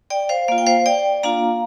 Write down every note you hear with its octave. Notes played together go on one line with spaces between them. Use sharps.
D5 G5
C5 F5
A#3 F4 F5
G5
C5 F5
D5 G5
A#3 D4 F4 F5 A#5